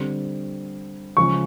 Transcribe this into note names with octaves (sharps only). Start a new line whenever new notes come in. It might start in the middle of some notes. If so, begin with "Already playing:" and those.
Already playing: D3 G3 C4
C#3 F3 G#3 C#6